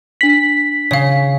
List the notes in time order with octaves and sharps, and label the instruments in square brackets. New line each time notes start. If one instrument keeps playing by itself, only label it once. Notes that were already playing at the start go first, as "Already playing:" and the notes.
[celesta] D4 F#7 [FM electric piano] B6
[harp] C#3 [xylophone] C#5 F5